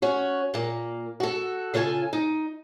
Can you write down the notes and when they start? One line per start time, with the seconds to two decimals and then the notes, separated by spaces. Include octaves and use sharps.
0.02 C#4 F#4
0.54 A#2 A#3
1.20 F#4 A4
1.74 C#3 F4 A4 C5 G#5
2.13 D#4